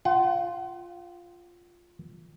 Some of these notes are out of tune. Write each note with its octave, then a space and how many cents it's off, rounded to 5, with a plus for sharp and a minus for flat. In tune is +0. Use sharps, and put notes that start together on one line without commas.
F4 +0 F#5 +40